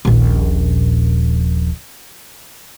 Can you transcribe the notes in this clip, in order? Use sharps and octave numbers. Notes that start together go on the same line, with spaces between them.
D#1 A#1